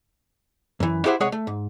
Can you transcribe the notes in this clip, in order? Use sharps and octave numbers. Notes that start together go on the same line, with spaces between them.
F#2 E3
E4 G4 G#4 C5 E5 F#5
C2 G#3 G#4 C#5 F#5
A3
G#2